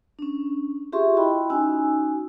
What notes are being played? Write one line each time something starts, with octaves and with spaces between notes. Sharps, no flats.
C#4 D4
F4 G4 G#4 E5 C6 C#6
E4 F#4 D#5 G5 B5 C6
C#4 D#4 F#4 G#5 E6